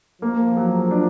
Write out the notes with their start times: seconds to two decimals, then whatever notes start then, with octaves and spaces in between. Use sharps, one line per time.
0.22 F3 A#3
0.57 F#3
0.91 D4